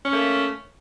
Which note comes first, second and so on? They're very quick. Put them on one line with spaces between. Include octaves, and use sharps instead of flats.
C#4 A#3 A3